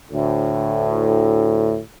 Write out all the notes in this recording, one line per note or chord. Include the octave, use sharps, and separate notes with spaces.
D2 A2